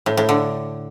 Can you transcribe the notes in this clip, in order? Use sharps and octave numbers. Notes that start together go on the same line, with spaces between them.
A2
A2
D3